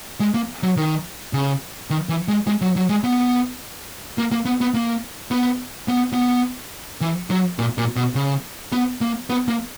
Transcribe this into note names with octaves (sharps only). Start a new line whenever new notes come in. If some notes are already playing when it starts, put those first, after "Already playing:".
G#3
A#3
F#3
D#3
C#3
D#3
E3
G#3
G#3
F#3
F#3
G#3
B3
A#3
A#3
B3
B3
A#3
B3
B3
B3
E3
F#3
A#2
A#2
B2
C#3
B3
A#3
B3
A#3